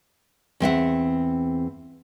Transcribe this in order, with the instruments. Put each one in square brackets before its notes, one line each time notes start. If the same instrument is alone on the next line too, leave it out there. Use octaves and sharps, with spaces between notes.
[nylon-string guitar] E2 C4 E5 F#5